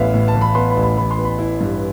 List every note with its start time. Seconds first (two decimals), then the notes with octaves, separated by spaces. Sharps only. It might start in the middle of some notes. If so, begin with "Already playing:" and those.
Already playing: A1 A2 E3 B3 E5 F5
0.14 A2
0.28 A5
0.35 E3
0.41 B5
0.55 B3 C6
0.70 B5
0.77 A1
0.83 B5
0.97 E3 B5
1.11 C6
1.18 B3
1.25 B5
1.39 E4
1.60 G2